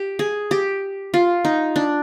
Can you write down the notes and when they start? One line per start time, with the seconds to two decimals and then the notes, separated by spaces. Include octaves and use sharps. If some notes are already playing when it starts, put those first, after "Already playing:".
Already playing: G4
0.19 G#4
0.51 G4
1.14 F4
1.45 D#4
1.76 D4